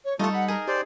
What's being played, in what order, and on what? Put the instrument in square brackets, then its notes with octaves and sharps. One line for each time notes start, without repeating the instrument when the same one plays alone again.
[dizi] C#5
[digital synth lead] G3 [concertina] A3 F4 [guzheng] D#4 A4 [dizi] C#6
[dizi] F#5 [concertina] B5
[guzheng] G#4 [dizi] A#4
[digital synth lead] G4 [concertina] C5 D5